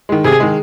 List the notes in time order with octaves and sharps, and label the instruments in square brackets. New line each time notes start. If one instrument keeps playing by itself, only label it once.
[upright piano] D#3 G#3
[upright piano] C3 [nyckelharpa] G#4
[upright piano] D#3 G#3